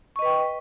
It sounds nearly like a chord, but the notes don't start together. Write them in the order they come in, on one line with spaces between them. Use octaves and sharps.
C#6 D#5 B4 G5